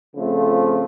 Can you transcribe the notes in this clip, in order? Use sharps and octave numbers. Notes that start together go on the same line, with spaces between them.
C#3 F3 A3 C4 F4